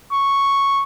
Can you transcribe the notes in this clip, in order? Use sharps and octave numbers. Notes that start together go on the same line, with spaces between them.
C#6